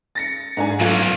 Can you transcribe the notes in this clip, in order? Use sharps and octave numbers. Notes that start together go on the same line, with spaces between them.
A6 A#6 C#7
G#2 D4 G#5
B1 A3 F4